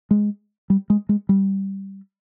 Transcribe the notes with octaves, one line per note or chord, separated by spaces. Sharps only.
G#3
G3
G#3
G#3
G3